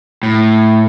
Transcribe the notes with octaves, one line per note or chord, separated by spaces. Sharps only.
A2